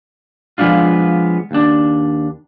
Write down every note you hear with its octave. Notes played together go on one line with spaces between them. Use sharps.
F3 G#3 B3 D4 F4
D#2 D4